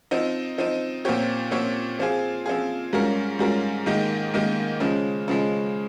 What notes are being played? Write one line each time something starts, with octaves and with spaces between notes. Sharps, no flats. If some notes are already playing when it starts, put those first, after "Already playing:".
F3 C4 D#4
F3 C4 D#4
A#2 F3 C4 G4 C#5
A#2 F3 C4 G4 C#5
F3 C4 F4 G#4
F3 C4 F4 G#4
G#2 G3 C#4 F4 A#4
G#2 G3 C#4 F4 A#4
G#2 D#3 A#3 D#4 G4
G#2 D#3 A#3 D#4 G4
C#3 F3 G#3
C#3 F3 G#3